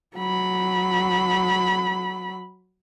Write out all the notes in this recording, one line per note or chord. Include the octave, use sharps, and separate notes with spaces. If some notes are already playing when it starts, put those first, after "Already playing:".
F#3 B5